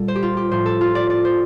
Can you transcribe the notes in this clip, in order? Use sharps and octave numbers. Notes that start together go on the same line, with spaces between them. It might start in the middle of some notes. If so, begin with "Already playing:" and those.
Already playing: A#2 G3 A4
C5
G4
F4
G4
A2 F3 C5
A4
F4
D5
D5
C5